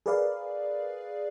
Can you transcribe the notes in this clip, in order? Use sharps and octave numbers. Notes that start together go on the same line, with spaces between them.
G#4 A#4 B4 D5 F5